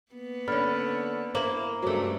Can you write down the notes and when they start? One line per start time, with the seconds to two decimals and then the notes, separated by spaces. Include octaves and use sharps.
0.12 A#3 B3
0.48 D3 C#4 B5 F6 A6
1.35 A#3 E4 C5 F#7
1.82 G2 C#3 F#3 G#3 A3 F#4 C5 D6